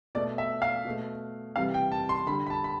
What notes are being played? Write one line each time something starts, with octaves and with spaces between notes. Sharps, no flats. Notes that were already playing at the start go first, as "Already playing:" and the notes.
B2 A3 D5
E5
F5
B2 A3
C3 E3 G3 F5
G5
A5
C6
D3 G3 B5
B5
A5
B5